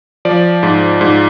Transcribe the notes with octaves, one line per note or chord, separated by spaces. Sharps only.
F3 D5
G#2
G#2